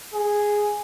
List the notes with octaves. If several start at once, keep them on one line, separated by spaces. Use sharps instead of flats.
G#4